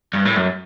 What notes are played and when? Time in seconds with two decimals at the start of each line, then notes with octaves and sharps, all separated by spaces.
0.14 G2
0.25 A2
0.36 F#2